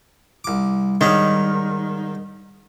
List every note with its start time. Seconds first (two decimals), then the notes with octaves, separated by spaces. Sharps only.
0.44 C2 D6
1.01 G#2 D#3 G3 C#4